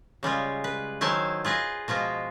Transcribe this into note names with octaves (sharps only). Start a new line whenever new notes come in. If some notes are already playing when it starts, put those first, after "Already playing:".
C#3 G3 G#3 F4
B4
D#3 F#3 E4 C5 G#5 A5
F4 G#4 B4 D#5
B2 F3 G#3 F4